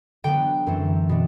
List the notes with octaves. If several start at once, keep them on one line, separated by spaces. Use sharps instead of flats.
D3 F#3 B3 G5
F#2 E3 A3 C4
B2 A3 D4